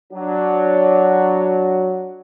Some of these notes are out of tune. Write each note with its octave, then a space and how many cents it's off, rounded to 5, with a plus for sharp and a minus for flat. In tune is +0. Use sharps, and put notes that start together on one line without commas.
F#3 +0 D4 +0